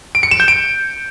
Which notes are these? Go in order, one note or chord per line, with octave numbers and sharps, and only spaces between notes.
D7
C#7
E7
G6
D7